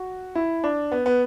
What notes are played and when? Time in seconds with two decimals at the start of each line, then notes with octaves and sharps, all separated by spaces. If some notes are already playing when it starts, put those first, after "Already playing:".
Already playing: F#4
0.35 E4
0.64 D4
0.92 B3
1.06 B3